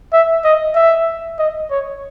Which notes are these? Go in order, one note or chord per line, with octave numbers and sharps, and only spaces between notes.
E5
D#5
E5
D#5
C#5